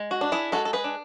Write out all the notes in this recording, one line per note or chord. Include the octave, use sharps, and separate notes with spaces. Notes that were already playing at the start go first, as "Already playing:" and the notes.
Already playing: G#3
F#4
D4
E4 G#4
G#3 F#4 A4
A4
G#4 B4
D4